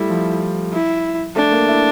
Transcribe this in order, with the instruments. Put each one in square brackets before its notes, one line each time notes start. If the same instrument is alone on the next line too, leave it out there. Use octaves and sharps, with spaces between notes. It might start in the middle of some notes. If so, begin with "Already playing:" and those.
Already playing: [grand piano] G3 A3 [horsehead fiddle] E4
[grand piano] F3
[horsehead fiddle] E4
[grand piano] A3 [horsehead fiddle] D4
[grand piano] A#3
E4